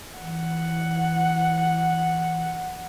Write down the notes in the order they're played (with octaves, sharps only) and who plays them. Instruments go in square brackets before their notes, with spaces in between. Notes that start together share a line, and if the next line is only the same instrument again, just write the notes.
[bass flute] E3 [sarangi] F#5